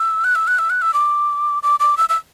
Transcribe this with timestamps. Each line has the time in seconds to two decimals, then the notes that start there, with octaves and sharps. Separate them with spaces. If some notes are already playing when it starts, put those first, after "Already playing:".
Already playing: E6
0.24 F#6
0.35 E6
0.47 F#6
0.59 E6
0.70 F#6
0.82 E6
0.94 D6
1.63 D6
1.80 D6
1.97 E6
2.09 E6